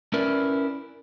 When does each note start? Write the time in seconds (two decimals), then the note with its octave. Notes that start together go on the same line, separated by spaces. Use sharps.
0.13 C#4 E4 A#4 B4 D5